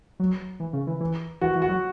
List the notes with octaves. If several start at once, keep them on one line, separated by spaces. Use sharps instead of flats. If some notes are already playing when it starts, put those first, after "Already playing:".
F#3
E3
C#3
E3
E3
E3 F#4
E3
F#4
F#3